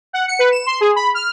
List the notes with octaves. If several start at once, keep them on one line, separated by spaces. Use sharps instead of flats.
F#5
C#7
B4
E7
C6
G#4
B5
F6